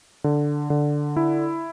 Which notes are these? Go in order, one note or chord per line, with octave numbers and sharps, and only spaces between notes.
D3
D3
E4